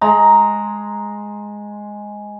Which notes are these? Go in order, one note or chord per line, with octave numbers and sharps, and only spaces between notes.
G#3 A#5